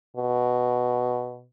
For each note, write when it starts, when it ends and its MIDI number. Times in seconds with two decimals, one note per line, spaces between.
0.16 1.47 47